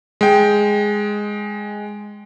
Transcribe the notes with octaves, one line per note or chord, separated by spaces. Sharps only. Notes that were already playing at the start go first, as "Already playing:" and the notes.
G#3 G5